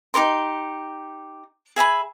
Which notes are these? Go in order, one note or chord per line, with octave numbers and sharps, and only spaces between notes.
D#4 G4 A#4 C6
G#4 E5 G#5 B5